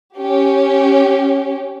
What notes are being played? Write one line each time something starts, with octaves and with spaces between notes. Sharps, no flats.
C#4 G4